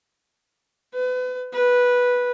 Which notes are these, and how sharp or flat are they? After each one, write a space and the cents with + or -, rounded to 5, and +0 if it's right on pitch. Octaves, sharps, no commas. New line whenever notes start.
B4 +35
B4 -10